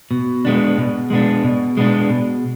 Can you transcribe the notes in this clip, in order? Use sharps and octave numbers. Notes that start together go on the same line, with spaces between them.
B2
G#3 B3 D4
B2
G#3 B3 D4
B2
G#3 B3 D4
B2